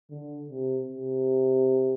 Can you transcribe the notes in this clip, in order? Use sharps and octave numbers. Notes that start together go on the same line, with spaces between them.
D3
C3
C3